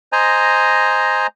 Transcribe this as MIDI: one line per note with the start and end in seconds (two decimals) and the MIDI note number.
0.12 1.27 72
0.12 1.27 75
0.12 1.27 80
0.12 1.27 82